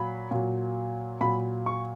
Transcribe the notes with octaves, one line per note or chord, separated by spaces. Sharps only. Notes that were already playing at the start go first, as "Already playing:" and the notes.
Already playing: A#2 F#3 B5
A#2 F#3
A#2 F#3 B5
C#6